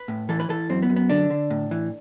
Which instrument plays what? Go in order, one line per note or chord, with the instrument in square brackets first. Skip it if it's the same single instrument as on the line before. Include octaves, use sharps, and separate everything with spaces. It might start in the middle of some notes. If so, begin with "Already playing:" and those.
Already playing: [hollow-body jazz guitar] B4
A2
E3 A4
B4
E3 A4
F#2 C4
B3
F#2
B3
D3 D4
D3
A2
E3